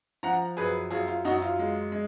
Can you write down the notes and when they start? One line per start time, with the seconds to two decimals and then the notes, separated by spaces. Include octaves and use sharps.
0.23 F3 F#5 A#5
0.57 F#2 G#4 B4
0.91 F#2 F4 G#4
1.08 F4
1.25 F#2 D#4 F#4
1.42 F4
1.59 G#3
1.92 G#3